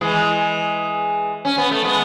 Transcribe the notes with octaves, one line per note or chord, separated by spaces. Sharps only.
E3 G#3
C#4
B3
A3
G#3 B3